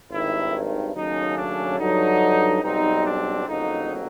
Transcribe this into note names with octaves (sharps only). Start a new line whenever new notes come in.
G#1 G2 D#3 E4
D#2 C#3 F#3 A3 C#4 D#4
D4
G2 D3 F#3 D#4
B1 B2 G3 C4 D#4
D4
G1 F2 C#3 F#3 A#3 D#4